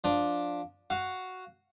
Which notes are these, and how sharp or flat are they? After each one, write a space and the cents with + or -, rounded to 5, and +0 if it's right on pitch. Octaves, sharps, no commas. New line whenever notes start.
F3 +15 D4 +0
F#4 +0 F5 +0